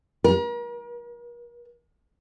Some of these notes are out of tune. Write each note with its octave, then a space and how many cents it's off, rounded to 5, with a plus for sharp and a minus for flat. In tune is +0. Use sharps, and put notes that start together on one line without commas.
A#4 +40